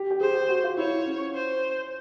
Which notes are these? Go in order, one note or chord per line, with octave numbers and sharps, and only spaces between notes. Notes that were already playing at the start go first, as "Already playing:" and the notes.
Already playing: G4
G4
G#4 C5
G4
F#4
F4
E4 C#5
C#4
C5